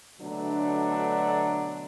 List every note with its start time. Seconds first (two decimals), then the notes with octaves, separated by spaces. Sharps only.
0.20 B2 D3 F#3 A3 D4